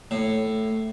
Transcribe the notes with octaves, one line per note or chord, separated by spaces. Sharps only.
A2